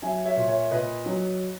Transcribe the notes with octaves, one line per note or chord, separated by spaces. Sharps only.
F#3 E5 G#5
C#5 E5
A#2
C#5 E5
A#2 B4 D#5
F#3